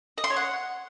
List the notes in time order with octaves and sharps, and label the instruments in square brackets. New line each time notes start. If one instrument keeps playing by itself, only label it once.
[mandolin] D#5
C6
C#5
F#5